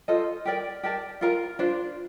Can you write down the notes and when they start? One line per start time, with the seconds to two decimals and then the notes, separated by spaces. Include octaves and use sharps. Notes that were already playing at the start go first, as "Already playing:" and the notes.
0.08 F4 A4 C5 D#5
0.46 G4 A#4 D5 G5
0.83 G4 A#4 D5 A5
1.21 F4 A#4 F5 A#5
1.59 D4 F4 C5